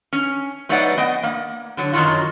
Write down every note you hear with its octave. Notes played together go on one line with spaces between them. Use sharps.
C#4
F#3 A3 B3 D#4 D5 F#5
B3 D#5 G5
A#3
D3 F#3
F#2 D#3 E3 F#3 F4 F#4